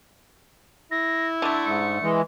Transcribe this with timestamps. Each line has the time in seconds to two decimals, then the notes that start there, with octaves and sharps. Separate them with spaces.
0.91 E4 A#6
1.42 D3 A3 D6
1.65 G#2 C#7
2.03 E3 G#3